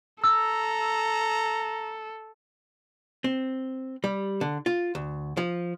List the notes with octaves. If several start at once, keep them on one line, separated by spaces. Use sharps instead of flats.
A4 A#5 E6
C4
G3
D3
F4
D2
F3